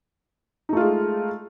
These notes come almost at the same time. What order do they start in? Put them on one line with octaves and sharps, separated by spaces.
D#4 A3 F4 G#3